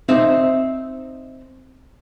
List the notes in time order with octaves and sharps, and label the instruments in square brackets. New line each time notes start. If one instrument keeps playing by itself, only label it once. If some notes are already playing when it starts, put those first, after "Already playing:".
[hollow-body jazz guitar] C4 D#4 C5 E5